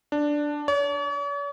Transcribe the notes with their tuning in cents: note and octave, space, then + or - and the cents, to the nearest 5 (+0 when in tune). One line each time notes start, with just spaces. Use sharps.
D4 +0
C#5 +45